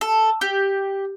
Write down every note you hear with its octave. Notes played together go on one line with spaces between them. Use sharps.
A4
G4